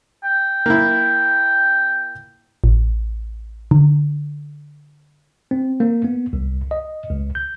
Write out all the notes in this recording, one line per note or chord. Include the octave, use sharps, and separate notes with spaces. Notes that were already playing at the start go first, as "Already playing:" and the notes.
G5
A#3 E4
A1
D3
C4
A#3
B3
C2
D#5
C#2
G6